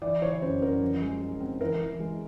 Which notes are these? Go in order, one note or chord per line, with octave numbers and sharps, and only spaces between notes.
E3 D5
E3 C#5
F#2 C5
F#2 A#4
F3
G#3
G#3
C4
E3 A#4
E3
G#3